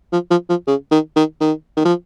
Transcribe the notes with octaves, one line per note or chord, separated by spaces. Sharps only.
F3
F3
F3
C#3
D#3
D#3
D#3
D#3
F3